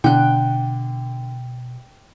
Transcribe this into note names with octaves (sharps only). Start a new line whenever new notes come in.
B2 D3 G5 F#6